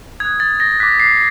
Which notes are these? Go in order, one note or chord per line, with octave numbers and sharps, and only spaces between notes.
D#6 F#6 G#6
A6
A#6
D6 F#6 B6
C7